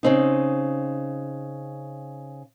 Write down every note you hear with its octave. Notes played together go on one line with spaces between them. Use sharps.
C#3 C4 D#4